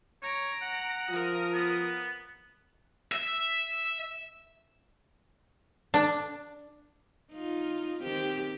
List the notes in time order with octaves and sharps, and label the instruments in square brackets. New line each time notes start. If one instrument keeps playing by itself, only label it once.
[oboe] C#5 [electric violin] A#5 D7
[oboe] F#5
[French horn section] F3 F4 [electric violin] A#4 D#6
[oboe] B3
[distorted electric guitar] E5
[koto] D4
[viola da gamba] D#4 F4
D#3 C4 G4